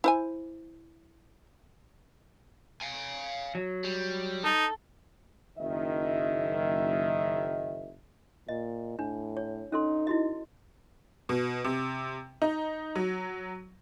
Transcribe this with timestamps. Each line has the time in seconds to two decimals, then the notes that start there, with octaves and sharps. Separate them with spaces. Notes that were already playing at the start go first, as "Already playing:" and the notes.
0.04 E4 C5 G#5
2.82 F5 G#5
3.55 F#3
3.84 G3
4.44 D#4 A4
5.58 F#1 D#3 D#5 E5
8.49 A#2 D#5
8.99 A2 D4
9.37 C#5
9.72 C#4 D#4 A4 C6
10.07 E4 F#4 D#5
11.29 B2
11.64 C3
12.42 D#4
12.96 F#3